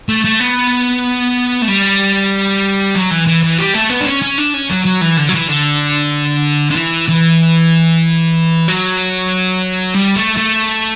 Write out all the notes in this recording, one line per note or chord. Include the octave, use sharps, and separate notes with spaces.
A3
A3
B3
A3
G3
F#3
E3
E3
E3
G3
A3
B3
D4
C#4
C#4
D4
C#4
F#3
F#3
E3
D3
F#3
E3
D3
D3
E3
E3
F#3
G3
A3
A3